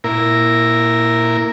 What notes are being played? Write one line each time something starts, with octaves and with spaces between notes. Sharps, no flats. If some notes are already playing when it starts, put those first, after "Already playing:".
A#2 E4 A#4